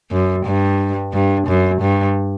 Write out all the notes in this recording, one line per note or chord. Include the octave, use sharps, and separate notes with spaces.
F#2
G2
G2
F#2
G2